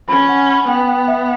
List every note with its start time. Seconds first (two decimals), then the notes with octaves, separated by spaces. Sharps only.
0.08 C#4 B5
0.29 F#5
0.49 B5
0.68 B3 G5
0.89 G5
1.08 E5